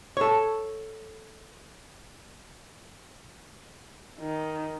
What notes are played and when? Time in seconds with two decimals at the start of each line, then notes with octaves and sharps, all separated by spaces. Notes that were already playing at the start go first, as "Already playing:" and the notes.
0.17 A4 C#5
4.20 D#3